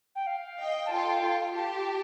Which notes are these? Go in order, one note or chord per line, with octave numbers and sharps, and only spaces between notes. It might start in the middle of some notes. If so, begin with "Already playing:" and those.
G5
F5
D#5 G5
A5
F4 A4 G5
F4
G4 A5